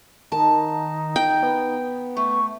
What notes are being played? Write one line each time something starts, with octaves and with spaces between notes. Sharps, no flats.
D#3 D#4 A5
G5
B3
A3 C#6